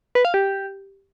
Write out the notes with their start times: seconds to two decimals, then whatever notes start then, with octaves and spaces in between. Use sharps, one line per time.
0.15 B4
0.25 F5
0.34 G4